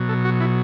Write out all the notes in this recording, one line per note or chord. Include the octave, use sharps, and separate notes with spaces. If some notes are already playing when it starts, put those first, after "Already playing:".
Already playing: B2 F#3
A4
F#4
E4